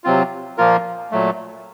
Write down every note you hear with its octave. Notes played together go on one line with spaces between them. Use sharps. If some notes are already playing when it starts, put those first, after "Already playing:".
C3 F#3 C4 F4
A#2 F3 A#3 F4 A#4
A#2 F#3 A3